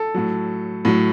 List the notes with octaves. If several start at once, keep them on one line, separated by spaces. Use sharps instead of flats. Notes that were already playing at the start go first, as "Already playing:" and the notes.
Already playing: A4
A2 F#3
A2 F#3